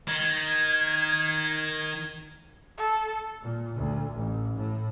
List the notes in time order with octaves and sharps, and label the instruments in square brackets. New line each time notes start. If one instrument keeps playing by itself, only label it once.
[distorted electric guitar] D#3 [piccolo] G#6
[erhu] A4
[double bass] A#2
D2
A1
A2